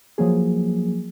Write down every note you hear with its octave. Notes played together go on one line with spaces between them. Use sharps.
F3 F#3 A#3 G#4